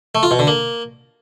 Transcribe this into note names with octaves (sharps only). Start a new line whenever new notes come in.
A3
F4
B2
D3
A#3